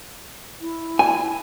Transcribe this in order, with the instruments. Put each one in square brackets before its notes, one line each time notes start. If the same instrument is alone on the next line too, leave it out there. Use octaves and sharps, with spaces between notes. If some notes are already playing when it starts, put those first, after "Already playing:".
[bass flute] E4
[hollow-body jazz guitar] G#5